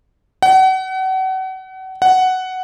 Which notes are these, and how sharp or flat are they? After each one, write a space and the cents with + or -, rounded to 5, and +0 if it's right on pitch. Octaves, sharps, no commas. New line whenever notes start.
F#5 +35
F#5 +5